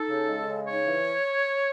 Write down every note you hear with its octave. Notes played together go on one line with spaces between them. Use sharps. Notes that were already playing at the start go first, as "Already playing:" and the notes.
Already playing: D#4 A4
C#3
G#3
C#3
D#4 C#5
E3